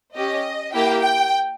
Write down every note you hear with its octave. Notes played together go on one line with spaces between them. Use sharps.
C#4 G4 D#5
A#3 E4 G4 G5
G5